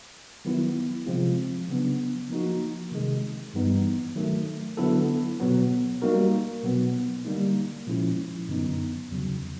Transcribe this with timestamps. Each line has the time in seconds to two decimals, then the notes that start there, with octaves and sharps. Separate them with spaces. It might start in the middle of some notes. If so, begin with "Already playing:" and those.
0.45 D#3 F#3 B3 E4
1.06 C3 F3 G#3 C4 F4
1.69 C#3 F#3 B3 D4
2.30 F3 A#3 D#4 F#4
2.92 C3 D#3 G#3
3.54 G2 E3 G3 B3 D#4
4.16 D#3 F#3 A3
4.77 D3 F#3 B3 E4 A4
5.40 B2 F#3 B3
6.02 G3 A#3 D#4 F#4 A#4
6.63 B2 F#3 B3
7.25 D3 G3 A#3 D#4
7.87 A#2 F3 G#3 C#4 E4
8.48 F#2 D3 F#3 B3 D#4
9.11 E2 C#3 F#3